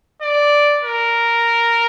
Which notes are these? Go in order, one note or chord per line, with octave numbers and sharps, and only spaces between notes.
D5
A#4